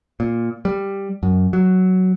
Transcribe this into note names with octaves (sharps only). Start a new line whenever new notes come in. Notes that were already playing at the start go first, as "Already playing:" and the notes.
A#2
G3
F#2
F#3